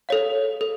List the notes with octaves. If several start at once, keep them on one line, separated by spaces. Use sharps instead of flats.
A4 C#5 F5
A4